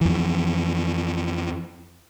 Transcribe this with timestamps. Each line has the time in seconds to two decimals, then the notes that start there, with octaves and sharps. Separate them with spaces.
0.01 F2 E3